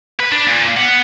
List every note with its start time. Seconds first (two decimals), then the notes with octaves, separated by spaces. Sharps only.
0.20 B4
0.32 D4
0.47 A#2
0.77 B3 F#5